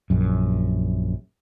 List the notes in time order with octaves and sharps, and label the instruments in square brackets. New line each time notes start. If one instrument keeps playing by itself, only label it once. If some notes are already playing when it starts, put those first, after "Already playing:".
[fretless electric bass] A#1 F#2